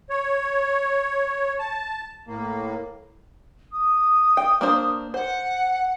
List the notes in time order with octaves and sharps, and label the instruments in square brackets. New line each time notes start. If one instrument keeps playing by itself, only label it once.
[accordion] C#5
A5
A2 A#3
[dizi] D#6
[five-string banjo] G5
A#3 D4 C5
[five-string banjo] C5 [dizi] F#5